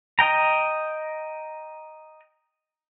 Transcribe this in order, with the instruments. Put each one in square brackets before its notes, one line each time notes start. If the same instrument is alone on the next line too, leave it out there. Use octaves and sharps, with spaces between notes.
[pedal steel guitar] D#5 G5 A#5